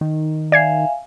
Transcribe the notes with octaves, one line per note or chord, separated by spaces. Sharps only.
D#3
D5 E5 F5 G#5 G#6 C7